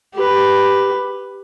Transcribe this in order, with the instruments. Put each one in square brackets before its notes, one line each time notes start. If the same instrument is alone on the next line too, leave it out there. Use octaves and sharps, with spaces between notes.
[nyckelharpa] G4 B4